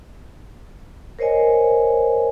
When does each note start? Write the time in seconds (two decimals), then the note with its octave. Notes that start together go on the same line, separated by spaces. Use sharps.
1.19 A#4 C5 C#5 D#5 G#5